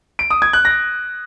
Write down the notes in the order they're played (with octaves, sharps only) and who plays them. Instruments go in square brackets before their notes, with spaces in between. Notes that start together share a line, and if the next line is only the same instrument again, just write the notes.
[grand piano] D7
D#6
G#6
F#6
A#6